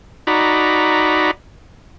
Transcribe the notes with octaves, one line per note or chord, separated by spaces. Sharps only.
D#4 F#4 D5 A#5 B5